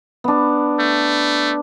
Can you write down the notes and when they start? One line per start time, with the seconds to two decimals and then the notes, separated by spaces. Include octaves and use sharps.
0.24 B3 D4
0.79 A3